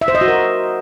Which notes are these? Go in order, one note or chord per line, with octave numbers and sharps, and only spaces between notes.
E5
C5
D#5
F#4
A#4